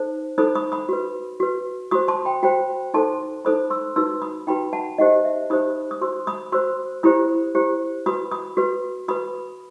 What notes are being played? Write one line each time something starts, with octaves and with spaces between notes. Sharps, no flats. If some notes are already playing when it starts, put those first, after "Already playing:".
Already playing: D#4 A4 C5
D#4 A4 C5 B5 D#6
B5 D#6
B5 D#6
F#4 B4
F#4 B4
F#4 C5 B5 D#6
A5 C6
G5 B5
F#4 C5 G5 B5
D#4 A4 C5 A5 C6
D#4 A4 C5 B5 D#6
C6 E6
D#4 F#4 B4 C6 E6
B5 D#6
D#4 F#4 B4 G5 B5
F#5 A5
D#4 G4 C5 D#5 F#5
E5
D#4 G4 C5 B5 D#6
D#6
F#4 C5 C6 E6
B5 D#6
F#4 C5 C6 E6
E4 G4 C5 B5 D#6
E4 G4 C5
F#4 B4 B5 D#6
B5 D#6
F#4 B4
F#4 B4 B5 D#6